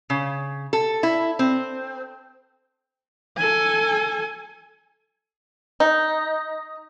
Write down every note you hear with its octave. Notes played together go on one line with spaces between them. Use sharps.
C#3
A4
E4
C4
A4 G#5
D#4